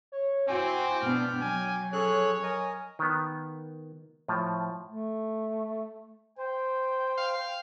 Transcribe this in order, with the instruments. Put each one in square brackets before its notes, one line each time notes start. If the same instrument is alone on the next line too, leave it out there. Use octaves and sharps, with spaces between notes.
[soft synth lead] C#5
[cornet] C4 [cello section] E4 F#4 [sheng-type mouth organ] G5 D6 [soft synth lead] G#5
[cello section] B2 B3 D4 [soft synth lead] F6
[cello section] F#3 [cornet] G#5
[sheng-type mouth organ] C#4 G#4 F#6 [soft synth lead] A4 [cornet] C#5
[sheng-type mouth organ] A#4 D#5 [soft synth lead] G#5
[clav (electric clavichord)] D#3 B3
A2 F3
[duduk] A3
[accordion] C5 [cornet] G5
[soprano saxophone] F5